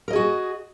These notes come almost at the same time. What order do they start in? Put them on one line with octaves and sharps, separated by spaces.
A#4 D#5 G#4 F#4